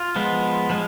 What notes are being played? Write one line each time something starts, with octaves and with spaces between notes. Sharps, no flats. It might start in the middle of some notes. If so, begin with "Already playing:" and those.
Already playing: F4
F3 G#3 B3
F3 G#3